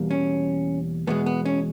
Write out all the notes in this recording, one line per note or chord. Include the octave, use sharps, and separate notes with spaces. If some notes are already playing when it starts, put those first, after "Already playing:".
Already playing: E2 B2 G3 A#3
C#4
E2 B2 G#3 B3
B3
C#4